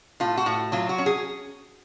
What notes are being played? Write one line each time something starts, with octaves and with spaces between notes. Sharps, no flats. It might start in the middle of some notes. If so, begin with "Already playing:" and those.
A2 F4
F#4
A2
F#3 F4
F#4
C#4
G#4